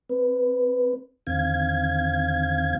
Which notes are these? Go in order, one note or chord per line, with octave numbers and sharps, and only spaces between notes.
C4 B4
E2 D3 D#3 C4 F5 G#6